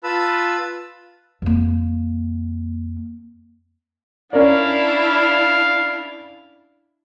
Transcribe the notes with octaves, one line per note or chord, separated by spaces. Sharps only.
F4 B4 A5 B5 E6
F2 A#3
C#4 D4 E4 A#4 D5 F5